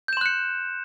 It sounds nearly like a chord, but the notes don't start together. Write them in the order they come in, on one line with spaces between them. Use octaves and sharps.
G6 E7 C6 F#6 C#7